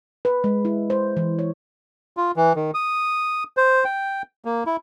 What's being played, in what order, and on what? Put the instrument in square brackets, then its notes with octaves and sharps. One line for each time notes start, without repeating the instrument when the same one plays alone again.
[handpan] B4
G#3
E4
C5
E3
C#5
[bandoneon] F4
E3
D#3
D#6
C5
G5
A#3
E4